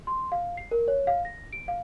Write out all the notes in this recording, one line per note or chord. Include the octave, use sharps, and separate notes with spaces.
C6
F5
C7
A#4
C#5
F5
A#6
D7
F5